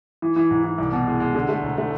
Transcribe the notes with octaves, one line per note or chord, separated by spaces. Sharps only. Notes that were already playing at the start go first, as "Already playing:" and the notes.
E3
E3
G#2
E3
C2
B2
G#3
G#3
D3
A3
E1
A3